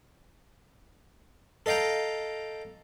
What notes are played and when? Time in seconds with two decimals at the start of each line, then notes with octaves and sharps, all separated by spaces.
1.66 A4 D#5 F5 G5 A#5